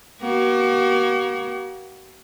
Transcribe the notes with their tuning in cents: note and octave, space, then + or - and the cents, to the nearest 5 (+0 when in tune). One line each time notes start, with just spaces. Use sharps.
A#3 +40 F#4 +40